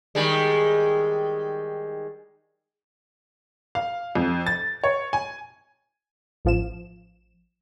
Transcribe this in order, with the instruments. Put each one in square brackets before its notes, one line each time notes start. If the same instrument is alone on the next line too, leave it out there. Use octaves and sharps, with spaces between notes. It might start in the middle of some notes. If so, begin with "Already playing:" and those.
[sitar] D#3 G3 G#3
[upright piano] F5
F2
A6
C#5
G#5
[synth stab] A1 F3 E7